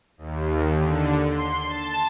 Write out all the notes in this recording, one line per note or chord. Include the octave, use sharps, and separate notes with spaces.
D#2
D3
C6
A5